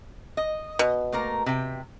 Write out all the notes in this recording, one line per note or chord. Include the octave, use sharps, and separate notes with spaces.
D#5
B2
A3 A#3 A#4
C3 G5